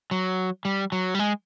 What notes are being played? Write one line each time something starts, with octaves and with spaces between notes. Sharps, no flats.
F#3
G3
F#3
G3
G#3